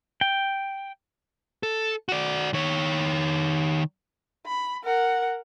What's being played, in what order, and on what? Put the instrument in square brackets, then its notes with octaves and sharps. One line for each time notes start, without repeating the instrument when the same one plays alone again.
[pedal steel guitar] G5
[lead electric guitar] A4
F#4 D5
D#3 C#5
[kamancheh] B5
A#4 F#5